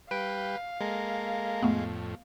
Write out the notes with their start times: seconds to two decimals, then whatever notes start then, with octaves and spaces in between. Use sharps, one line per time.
0.11 G3 B4 F5 G5 D7
0.81 G#3 A#3 A4 A#4
1.63 F2 A2 A3 B3